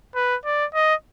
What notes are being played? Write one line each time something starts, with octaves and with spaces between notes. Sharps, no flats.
B4
D5
D#5